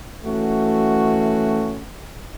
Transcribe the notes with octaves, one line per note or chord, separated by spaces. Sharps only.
E3 A3 C#4 F#4